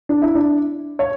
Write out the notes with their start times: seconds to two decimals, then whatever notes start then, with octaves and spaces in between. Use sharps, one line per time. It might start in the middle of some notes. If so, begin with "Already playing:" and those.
0.09 D4
0.22 E4
0.35 D4
0.99 C#5